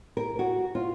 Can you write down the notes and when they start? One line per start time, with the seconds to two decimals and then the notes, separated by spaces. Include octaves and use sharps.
0.17 A#4
0.39 F#4
0.75 F4